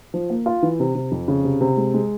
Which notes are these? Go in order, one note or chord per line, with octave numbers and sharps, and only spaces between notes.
F3
A#3
F4
E3
C3
C3
F2
C#3
C3
C3
G#3
G#3